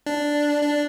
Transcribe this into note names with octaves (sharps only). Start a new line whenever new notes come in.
D4
D4